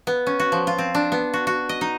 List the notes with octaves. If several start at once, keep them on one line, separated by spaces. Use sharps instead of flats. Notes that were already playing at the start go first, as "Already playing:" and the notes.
B3
C#4
F#4
F3
F4
C4
D4
B3
F#4
F#4
D#5
D#4